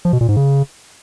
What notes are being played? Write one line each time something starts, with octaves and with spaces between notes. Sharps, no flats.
F3
B2
A#2
G#2
C#3